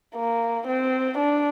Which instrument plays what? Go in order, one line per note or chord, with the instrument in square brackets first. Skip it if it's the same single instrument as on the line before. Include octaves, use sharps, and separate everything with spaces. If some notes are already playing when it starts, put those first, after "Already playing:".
[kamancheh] A#3
C4
D4